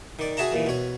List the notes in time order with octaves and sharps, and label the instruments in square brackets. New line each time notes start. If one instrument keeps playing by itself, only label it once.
[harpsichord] D#3 D5
F#4 G#4 E5 A5 A#5
D#2 A#2 E3
B2 C#5